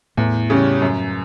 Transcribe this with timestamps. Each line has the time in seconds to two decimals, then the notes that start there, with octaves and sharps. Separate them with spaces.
0.17 E2 A2 A3
0.50 C#3 G3 C#4
0.82 F#2